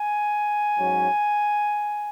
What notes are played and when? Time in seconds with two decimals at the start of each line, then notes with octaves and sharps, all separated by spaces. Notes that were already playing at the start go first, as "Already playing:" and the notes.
Already playing: G#5
0.77 G#2 F#3 C#4